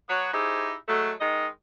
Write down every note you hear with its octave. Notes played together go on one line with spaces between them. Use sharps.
F#3 B3 F#4 C#5
D#4 E4 G4 G#4 C5
F#3 G#3 A3
D#3 G#3 D#4 D#5